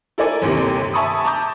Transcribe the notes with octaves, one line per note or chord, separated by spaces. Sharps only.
E4 A4 A#4 D5 G#5
G1 D#2 C3 G4
E5 G#5 A5 B5 C#6 D#6
A5 A#5 D6 G6